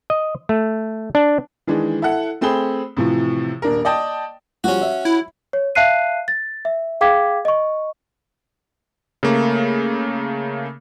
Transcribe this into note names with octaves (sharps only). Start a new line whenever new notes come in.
D#5
A3
D4
D#3 E3 G#3 D4
E4 A4 F#5
A3 C4 G#4 B5 G7
A2 C3 E3 F3
D#1 D4 A#4
D5 D#5 G5 A5
F3 G3 C#4 F4 F#4
E5
E4
C#5
E5 F5 A5 F#6 C7 D#7
A6
E5
G#4 F5 G5 D6 G#6 B6
D#5 C#6
C#3 A3 A#3